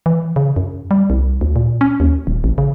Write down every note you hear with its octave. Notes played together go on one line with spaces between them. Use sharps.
E3
C#3
F#2
G3
C2
D2
A#2
C#4
D#2
D#1
A1
C#3